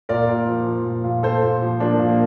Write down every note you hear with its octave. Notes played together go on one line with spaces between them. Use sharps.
A#2 A#4 D5
A#2
F3
F3
A#2
A#2
A#2 A4 C5
A#2
F3
F3 A#3 D4
A#2
A#3